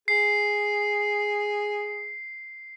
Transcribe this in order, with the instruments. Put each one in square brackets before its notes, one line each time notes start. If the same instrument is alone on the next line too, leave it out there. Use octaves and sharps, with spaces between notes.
[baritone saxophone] G#4 [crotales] C7